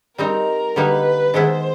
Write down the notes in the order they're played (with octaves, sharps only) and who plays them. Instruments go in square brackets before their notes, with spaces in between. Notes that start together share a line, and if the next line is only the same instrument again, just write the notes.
[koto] G3 C4 D#4 [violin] A#4
[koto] D3 G3 A#3 D#4 [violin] B4
[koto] D#3 G#3 B3 E4 [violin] C5